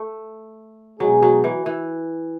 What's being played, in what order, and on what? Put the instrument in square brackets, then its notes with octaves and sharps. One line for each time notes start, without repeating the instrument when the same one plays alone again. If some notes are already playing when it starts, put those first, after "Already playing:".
Already playing: [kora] A3
[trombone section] B2 G#3 D#4 G#4 [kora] F#3
[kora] F#3
E3
E3